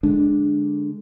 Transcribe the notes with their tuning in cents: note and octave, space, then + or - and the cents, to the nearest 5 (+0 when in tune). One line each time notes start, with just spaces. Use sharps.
D3 +0 G#3 +0 D4 +0